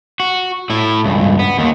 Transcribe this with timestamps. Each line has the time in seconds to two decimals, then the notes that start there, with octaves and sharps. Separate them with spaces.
0.20 F#4
0.70 A2 E4
1.04 C#2 G2
1.39 B3
1.58 D#2 D#3